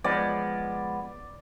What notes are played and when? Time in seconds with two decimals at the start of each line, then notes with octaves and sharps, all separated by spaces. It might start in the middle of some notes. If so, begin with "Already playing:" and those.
0.04 F3 G#3 B3 D5